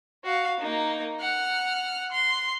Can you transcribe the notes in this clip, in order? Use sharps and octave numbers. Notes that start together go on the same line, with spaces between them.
F#4 F5
A#3 D#4
F#5 F6
C6